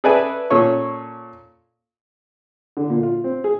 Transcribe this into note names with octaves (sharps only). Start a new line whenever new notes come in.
G#4 A4 B4 D5 E5 G#5
A#2 C#4 A4 C#5 C#6
D3
A#2
F4
C4
G#4